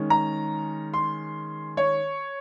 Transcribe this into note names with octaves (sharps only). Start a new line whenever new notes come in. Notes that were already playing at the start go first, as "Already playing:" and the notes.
Already playing: D#3 G#3 C#4
A#5
C6
C#5